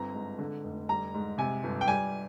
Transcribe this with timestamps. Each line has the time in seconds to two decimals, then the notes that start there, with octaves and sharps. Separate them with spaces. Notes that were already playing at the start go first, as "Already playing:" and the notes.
Already playing: G1 C4 A#5
0.14 G#2
0.39 D3
0.64 F1
0.89 G3 A#5
1.14 G#2
1.38 C3 G#5
1.63 G1
1.81 G5
1.88 G3 G#5